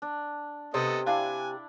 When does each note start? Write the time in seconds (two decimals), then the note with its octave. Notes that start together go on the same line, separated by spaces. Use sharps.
0.02 D4
0.74 C3 B3 A4 D#5
1.06 D4 E4 D5 F5 G5 G#5